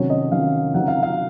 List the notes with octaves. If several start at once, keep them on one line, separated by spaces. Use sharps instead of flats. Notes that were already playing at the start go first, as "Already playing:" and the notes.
Already playing: C3 D#3 F#3 C#4 C#5
D#5
C3 D#3 F#3 C#4 F5
C#3 F#3 C4 D#4 F#5
F5
F5